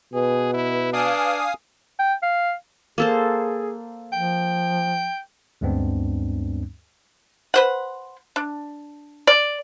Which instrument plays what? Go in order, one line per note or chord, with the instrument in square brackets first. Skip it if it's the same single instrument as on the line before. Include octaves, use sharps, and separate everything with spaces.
[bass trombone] B2 [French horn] G#4 [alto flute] B4
[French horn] E4
[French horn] D4 [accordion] F5 G#5 D#6
[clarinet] G5
F5
[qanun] A#3 A4 C5 [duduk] G#4
[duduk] F3 [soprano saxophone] G5
[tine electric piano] D2 G2 G#3 B3 C4 D4
[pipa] B4 C5 F#5
D4
D5